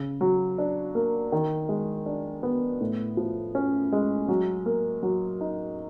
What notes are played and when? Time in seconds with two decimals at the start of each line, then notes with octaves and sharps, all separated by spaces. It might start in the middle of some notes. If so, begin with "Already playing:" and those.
Already playing: C#3
0.21 F#3
0.58 D4
0.95 A#3
1.32 D#3
1.69 G#3
2.06 D4
2.43 B3
2.81 A2
3.17 F3
3.55 C#4
3.92 G#3
4.28 F#3
4.66 A#3
5.03 F#3
5.41 D#4